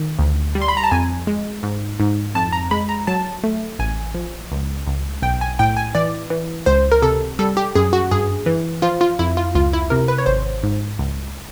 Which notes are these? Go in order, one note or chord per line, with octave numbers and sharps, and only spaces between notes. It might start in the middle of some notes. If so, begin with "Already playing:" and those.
Already playing: D#3
D2
G3
C6
B5
A#5
A5
F2 G#5
G#3
G#2
G#2
F2 A5
A#5
G#3 B5
A#5
F#3 A5
A3
A1 G#5
F3
C#2
C#2
B1 G5
G#5
A2 G5
G#5
E3 D5
E3
C#2 C5
A#4
C3 A4
G3 A4
G4
F#2 G#4
F#4
G2 G#4
E3
F3 F4
F4
F2 E4
F4
C#2 F4
E4
C3 A#4
B4
C#5
G#1 C5
G#2
C#2